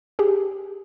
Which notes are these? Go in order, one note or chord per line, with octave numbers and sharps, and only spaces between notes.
G4 G#4